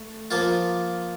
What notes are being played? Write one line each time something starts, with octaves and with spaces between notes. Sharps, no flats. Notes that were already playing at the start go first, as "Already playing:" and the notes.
Already playing: A3
F3 A#3 F4